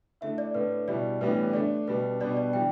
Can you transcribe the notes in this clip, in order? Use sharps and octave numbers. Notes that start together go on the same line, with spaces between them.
D3 A3 E4 E5
D5
A2 A3 D4 B4
B2 G3 E4 D5
A2 E3 G3 B3 D4 B4
D3 A3 D4 D5
B2 G3 D4 B4
B2 G3 B3 D4 D5
D5
E3 G3 D4 G5